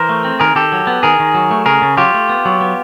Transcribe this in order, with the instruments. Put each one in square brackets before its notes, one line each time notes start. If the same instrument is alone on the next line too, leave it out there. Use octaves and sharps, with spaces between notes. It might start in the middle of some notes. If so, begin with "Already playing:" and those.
Already playing: [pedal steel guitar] E3 A#4 C5
A3
C4
D#3 G#4 A#4
D#3 G4 A4
F#3
B3
D#3 G#4 A#4
D#3
F#3
A3
C#3 G#4 A#4
C#3
F#3 F4 G4
A3
B3
F#3
B3